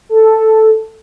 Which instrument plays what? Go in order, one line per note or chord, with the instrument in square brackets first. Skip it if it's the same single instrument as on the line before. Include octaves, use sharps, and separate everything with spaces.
[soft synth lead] A4